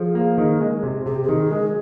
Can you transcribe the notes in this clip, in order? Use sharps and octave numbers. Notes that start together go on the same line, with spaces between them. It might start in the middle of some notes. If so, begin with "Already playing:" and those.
Already playing: F3 G#4
A#3
D#3
G#3
C3
C3 G#4
G4
G#4
D#3
G#3